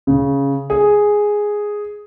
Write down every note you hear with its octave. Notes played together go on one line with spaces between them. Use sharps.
C#3
G#4